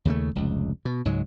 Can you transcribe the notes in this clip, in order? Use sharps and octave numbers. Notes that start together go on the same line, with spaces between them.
D#2 C#3 G#3 A3
F1 C#2
B2
C#2 G#2 F#3 G#3